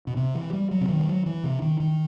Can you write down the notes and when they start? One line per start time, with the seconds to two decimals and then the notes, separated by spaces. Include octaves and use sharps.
0.07 B2
0.17 C3
0.35 E3
0.53 G3
0.71 F#3
0.81 C3
0.89 D#3
0.99 G3
1.08 F#3
1.26 E3
1.44 C3
1.62 D#3
1.80 D#3